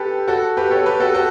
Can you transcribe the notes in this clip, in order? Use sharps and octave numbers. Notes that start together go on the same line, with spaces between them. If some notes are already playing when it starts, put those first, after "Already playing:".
Already playing: G4 A4 B4
F#4 A4
G4 B4
A4 C#5
G4 B4
F#4 A4
F#4 A4